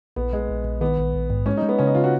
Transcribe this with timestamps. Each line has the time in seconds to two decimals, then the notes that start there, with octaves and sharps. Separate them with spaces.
0.16 A#1 B3
0.33 A#1 G#3
0.49 A#1
0.64 A#1
0.81 D#3 B3
0.98 A#1
1.14 A#1
1.30 G#2
1.46 G#3 C#4
1.57 D#4
1.62 G#3
1.69 B3
1.79 C#3 C#4
1.87 D#4
1.95 C#3 F4
2.04 F#4